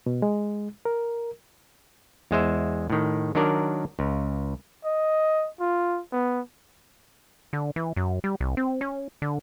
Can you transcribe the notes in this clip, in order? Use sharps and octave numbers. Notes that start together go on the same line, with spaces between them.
B2
G#3
A#4
E2 G#3 C5 E5
A2 D#3
D#3 F#3 D4 A#4 D5
C#2
D#5
F4
B3
D3
E3
F#2
G3
C2
C4
C#4
D3